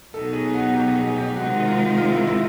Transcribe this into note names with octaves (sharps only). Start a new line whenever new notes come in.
B2 F#3 B3 D#4 A4
G#4
F#4
G4
G#4
G4
C3 D#3 G#3 C4 D#4 F#4
F4
F4
E4
E4